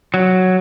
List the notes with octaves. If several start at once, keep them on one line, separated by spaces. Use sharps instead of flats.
F#3